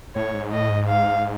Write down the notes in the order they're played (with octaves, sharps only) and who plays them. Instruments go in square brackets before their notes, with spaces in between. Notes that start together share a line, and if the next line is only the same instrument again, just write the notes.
[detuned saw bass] A2 [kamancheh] C#5
[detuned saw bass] G#2
[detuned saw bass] A2 [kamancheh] D#5
[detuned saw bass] G#2
[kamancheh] F5